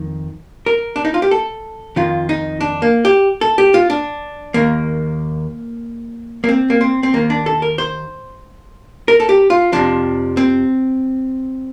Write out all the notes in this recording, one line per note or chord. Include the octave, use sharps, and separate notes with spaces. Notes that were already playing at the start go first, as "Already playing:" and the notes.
Already playing: F2 D#3
A#4
D4
D#4
F4
G4
A4
F2 D#3 F4
D#4
D4
A#3
G4
A4
G4
F4
D4
D#2 D#3 A#3
A#3
C4
A#3
C4
C4
D#2 D#3 A#3
D4
A4
A#4
C5
A#4
A4
G4
F4
F2 C3 F3 D4
C4